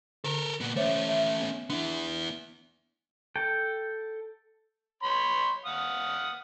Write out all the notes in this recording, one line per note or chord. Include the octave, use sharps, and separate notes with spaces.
D3 A4 A#4
A#2 B3
A3 C#4 C5 C#5 E5
E5
B3
B3 D4 E4
A4 G5
C#5 B5 C6
F5 F#5 D#6